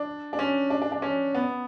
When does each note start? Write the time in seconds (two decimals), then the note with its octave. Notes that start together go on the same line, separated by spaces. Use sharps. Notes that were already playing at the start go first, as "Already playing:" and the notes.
Already playing: D4
0.33 D4
0.39 C#4
0.70 D4
0.82 D4
0.92 D4
1.02 C#4
1.35 B3